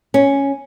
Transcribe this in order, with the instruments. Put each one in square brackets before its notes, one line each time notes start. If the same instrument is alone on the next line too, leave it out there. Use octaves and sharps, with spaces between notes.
[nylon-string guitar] C#4